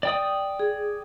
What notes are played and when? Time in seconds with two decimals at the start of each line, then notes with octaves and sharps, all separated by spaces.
0.03 D5 G5 D#6
0.59 G#4